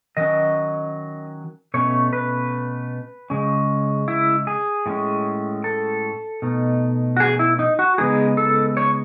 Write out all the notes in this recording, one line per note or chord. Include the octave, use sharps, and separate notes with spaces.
D#3 F#3 C#4 D#5
B2 A3 C#4 C#5
B4
C#3 G#3 C#4
E4
G#4
A2 G#3 C#4
A4
B2 A3 D#4
F#4
G#4
E4
D#4
F#4
C#3 G#3 B3 D#4 G#4
A4
C#5